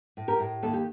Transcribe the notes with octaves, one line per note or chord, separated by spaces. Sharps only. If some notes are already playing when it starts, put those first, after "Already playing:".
A2
G4 A#4
A2
D#2 A4
G4